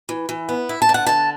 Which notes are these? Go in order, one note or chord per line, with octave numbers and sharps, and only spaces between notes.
E3
E3
B3
E4
A5
D3
F#5
D3 A5